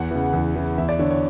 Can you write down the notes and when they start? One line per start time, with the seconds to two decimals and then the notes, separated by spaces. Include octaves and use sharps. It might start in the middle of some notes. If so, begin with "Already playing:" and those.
Already playing: E2 F#5
0.11 C#3 E3
0.33 E2
0.56 C#3 E3
0.78 E2 E5
0.89 D5
0.99 D3 C#5
1.11 C#5